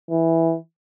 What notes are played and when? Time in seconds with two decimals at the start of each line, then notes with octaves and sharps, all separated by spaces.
0.11 E3